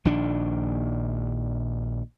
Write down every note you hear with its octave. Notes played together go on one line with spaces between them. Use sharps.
A#1 D#3 D4